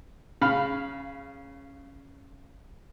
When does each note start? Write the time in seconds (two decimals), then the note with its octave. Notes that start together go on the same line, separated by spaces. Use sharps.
0.42 C#3 F5 B5